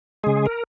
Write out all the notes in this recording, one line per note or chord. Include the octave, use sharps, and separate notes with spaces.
C#3 G#3 G#4
A#4